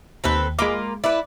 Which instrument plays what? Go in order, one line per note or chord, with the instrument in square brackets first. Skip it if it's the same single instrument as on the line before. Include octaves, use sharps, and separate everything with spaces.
[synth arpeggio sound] D#2 B6 [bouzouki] C4 A4 B4
[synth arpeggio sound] G#3 B5 D6 [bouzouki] A#3 F4
[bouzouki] E4 B4 [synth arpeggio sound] D5